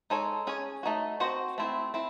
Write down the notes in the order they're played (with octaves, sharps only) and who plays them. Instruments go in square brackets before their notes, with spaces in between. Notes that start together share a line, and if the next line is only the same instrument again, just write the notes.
[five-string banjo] G#3 D#4 A4 C#5
C#4 G#4 C#5
A3 D#4 F#4
C4 F#4 C5 D#5
A3 C4 E4
C4 E4